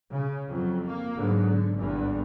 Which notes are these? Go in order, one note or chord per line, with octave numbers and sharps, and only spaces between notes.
C#3
F2 F#3
A#3
G#2 D3 F#3 G#3 B3
D3
G#1 E2 G2 D3 E3